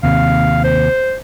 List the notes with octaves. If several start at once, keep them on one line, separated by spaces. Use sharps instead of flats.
D#2 C3 F5
C5